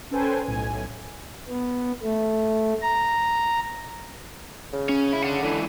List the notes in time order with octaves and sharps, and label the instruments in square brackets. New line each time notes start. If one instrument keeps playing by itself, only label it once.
[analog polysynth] C#4 A4 B4 C5 G5 G#5
B1 A2 G#5
[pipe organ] B3
A3
A#5
[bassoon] C#3
[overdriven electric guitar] C#4
E4
D4 F#5
[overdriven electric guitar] C#2 E3 [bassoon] D3